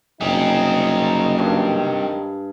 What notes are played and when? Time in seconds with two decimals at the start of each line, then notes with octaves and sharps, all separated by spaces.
0.21 F#1 G3 C4 D#4 G#4
1.39 G2 D#3